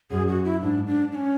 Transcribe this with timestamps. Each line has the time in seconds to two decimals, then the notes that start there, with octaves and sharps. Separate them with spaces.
0.11 F#2 G#4
0.28 F#4
0.45 E4
0.62 G#2 D4
0.87 D4
1.12 D4
1.15 C#4